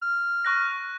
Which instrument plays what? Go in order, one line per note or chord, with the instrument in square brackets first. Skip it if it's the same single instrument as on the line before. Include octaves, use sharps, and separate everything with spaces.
[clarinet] F6
[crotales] C#6 F#6 A#6